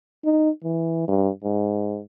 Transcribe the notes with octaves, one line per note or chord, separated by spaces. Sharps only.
D#4
E3
G2
G#2